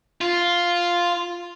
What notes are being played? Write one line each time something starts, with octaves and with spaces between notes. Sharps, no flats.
F4